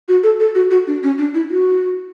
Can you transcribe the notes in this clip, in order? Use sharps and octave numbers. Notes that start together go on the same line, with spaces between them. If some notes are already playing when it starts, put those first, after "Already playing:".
F#4
A4
A4
F#4
F#4
D4
C#4
D4
E4
F#4